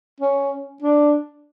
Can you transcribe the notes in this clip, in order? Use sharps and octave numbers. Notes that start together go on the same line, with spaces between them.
C#4
D4